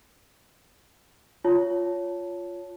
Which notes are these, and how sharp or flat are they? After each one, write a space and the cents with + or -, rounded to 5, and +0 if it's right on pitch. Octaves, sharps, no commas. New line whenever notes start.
F4 +0 C#5 +15 A5 -5